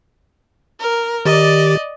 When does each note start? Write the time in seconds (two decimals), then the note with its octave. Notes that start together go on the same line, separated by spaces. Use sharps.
0.80 A#4
1.25 D#3 G4 D5 D#5 A6